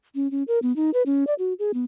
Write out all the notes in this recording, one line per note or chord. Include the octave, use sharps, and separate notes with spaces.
C#4
C#4
A#4
B3
D#4
B4
C#4
D5
F#4
G#4
B3